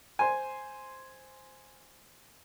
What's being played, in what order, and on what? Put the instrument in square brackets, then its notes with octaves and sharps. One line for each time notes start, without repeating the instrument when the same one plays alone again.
[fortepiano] C5 G#5